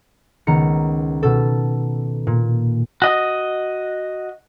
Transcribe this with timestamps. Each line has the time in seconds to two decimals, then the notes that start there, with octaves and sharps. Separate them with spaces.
0.47 C#2 D#3 B3 A#5 C#7
1.23 B2 A4
2.27 A#2
3.02 F#4 D#5